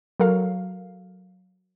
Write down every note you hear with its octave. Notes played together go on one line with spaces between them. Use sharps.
F#3 A4 A#4 F5